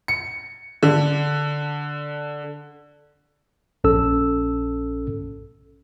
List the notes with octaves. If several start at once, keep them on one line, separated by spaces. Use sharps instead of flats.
C#7
D3
A#1 C#4 A4 E6